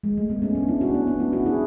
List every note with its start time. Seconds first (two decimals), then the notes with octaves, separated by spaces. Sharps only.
0.04 G#3
0.17 A3
0.29 G#3 B3
0.42 A3 C#4
0.55 B3 D4
0.68 C#4 E4
0.81 D4 F#4
0.94 B3 D4
1.07 B3 D4
1.20 C#4 E4
1.33 D4 F#4
1.45 E4 G#4